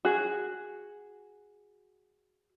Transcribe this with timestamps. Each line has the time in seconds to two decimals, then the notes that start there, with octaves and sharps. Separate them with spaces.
0.05 F#4 G#4